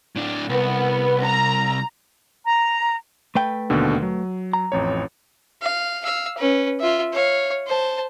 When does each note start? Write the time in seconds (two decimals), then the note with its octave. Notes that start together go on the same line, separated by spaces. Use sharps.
0.16 A2 D4
0.49 C2 B3
1.24 A#5
2.45 A#5
3.35 A3 B4 G5
3.70 D#2 B2 D3
4.02 F#3
4.53 A#5
4.72 A1 F2 C#5
5.62 F5
6.04 F5 E6
6.38 C#4 B4
6.80 F4 E5
7.13 C#5 F5
7.67 C5 A5